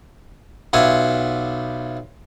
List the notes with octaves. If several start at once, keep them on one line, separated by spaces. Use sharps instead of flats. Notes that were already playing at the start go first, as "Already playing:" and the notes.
B1 F4 E5 F#5 G#5